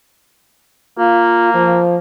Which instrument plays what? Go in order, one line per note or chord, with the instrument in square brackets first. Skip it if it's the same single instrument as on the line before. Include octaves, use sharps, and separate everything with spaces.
[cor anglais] A#3 [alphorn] F4
[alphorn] F3